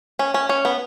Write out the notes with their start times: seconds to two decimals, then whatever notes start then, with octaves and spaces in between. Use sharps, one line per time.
0.19 C#4
0.34 C#4
0.49 C#4
0.65 B3